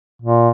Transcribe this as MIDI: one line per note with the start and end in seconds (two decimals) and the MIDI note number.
0.22 0.50 46